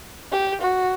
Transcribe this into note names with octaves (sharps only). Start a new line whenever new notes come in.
G4
F#4